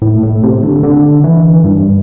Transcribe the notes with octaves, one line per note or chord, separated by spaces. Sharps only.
A2
A2
C3
D3
D3
E3
G2